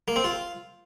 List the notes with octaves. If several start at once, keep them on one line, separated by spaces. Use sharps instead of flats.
A#3
C4
F4